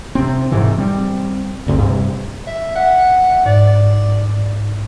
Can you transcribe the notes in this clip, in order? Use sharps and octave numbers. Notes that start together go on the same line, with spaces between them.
C3 C4
G#2 C3 D#3 E3
G3 C4
G1 D2 B2 C4
G2 C3
E5
E5 F#5
G#2 D5